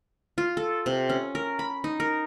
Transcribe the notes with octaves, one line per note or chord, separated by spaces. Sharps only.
F4
A4
C3
C#4
A#4
B5
D#4
A#4